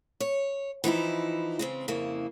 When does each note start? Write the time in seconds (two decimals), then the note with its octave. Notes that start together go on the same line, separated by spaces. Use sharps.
0.20 C#5
0.84 E3 F3 D#4 E4
1.59 C#3 G#3 C4
1.88 F2 C#3 A#3 E4